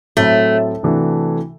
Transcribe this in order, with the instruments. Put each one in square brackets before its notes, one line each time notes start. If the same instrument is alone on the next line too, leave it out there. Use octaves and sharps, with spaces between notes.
[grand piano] A2 F#3 C4 [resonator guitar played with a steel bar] A3
[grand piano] C3 E3 A3 D4 F#4